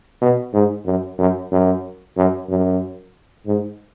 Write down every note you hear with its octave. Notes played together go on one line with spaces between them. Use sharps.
B2
G#2
F#2
F#2
F#2
F#2
F#2
G#2